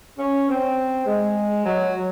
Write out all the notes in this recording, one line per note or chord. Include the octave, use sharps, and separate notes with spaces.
C#4
C4
G#3
F#3